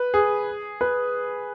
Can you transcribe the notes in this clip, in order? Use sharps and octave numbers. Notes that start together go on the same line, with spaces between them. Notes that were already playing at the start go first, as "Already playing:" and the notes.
Already playing: B4
G#4
B4